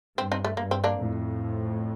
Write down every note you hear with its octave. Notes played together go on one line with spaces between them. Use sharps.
G2 C4
C4 D#4
A3
G2 A#3
C4
A#3 D4
F2 A2